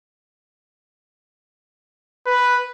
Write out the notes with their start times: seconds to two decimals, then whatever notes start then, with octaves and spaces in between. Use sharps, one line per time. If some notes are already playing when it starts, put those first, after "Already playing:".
2.27 B4